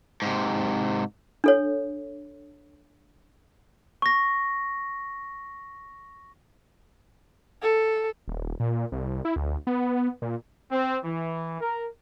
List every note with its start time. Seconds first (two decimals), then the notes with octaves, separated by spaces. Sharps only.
0.22 G#2 C3
1.44 D4 A4 C#5
4.02 C#6 A#6
7.62 A4
8.28 D#1
8.60 A#2
8.92 C2
9.25 E4
9.36 D2
9.67 B3
10.22 A#2
10.71 C4
11.04 E3
11.61 A#4